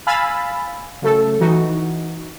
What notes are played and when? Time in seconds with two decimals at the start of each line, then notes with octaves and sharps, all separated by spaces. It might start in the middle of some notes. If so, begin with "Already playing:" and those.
0.07 F5 G#5 B5 E6 A6
1.02 C#3 F#3 A3 A4
1.41 E3 D#4 F#4